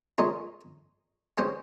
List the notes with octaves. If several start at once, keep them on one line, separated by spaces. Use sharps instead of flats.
G#3 C#4 F4 A#4 D#5
G#3 C#4 G4 C5 D#5